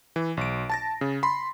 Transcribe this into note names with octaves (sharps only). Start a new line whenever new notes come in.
E3
B1 D7
A5 A6 A#6
C#3
B5 C6